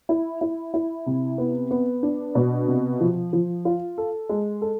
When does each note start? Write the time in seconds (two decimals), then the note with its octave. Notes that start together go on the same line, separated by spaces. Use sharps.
0.09 E4
0.41 E4
0.74 E4
1.06 C3
1.38 B3
1.71 B3
2.03 D4
2.35 B2
2.67 C3
3.00 F3
3.33 F3
3.65 F4
3.98 A4
4.29 G#3
4.62 A4